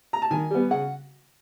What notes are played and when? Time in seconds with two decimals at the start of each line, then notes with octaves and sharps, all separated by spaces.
0.13 A#5
0.22 A5
0.31 D#3 G#5
0.51 G3 B3
0.71 C#3 F#5